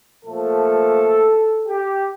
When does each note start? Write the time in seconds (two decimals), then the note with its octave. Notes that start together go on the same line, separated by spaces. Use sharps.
0.24 A#2 F3 A3 A4
1.67 G4